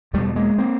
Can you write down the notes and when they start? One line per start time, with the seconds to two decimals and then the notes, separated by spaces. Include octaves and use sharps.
0.13 E2 B2 G3 A3
0.36 G#3 A#3
0.58 A#3 C4